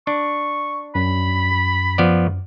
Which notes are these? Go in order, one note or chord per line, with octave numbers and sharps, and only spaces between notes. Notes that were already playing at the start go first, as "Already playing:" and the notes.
D4 C#6
F#2 B5
F3 B3 D5